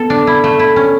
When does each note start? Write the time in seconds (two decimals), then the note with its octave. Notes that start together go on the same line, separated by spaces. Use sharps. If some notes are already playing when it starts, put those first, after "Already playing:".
Already playing: B3 A4
0.10 D4
0.27 E4
0.44 A3
0.59 E4
0.76 C#4